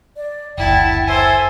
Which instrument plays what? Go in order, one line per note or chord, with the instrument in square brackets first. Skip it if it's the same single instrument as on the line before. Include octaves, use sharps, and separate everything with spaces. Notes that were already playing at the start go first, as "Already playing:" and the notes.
[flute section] D5
[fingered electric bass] F#1 D2 [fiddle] E4 A5 [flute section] F#5 G5
[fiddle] A4 C5 [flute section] E5 E6 [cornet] G#5